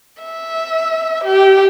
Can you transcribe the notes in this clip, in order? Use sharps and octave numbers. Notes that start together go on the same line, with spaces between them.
E5
G4